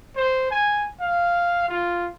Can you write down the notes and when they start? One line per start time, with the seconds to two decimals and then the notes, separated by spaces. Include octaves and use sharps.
0.16 C5
0.51 G#5
1.00 F5
1.68 F4